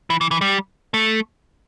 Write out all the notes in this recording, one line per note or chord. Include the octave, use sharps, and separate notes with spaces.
E3
E3
E3
G3
A3